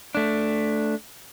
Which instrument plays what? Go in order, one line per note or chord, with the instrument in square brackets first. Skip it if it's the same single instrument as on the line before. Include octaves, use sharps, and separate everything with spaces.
[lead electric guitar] A3 D4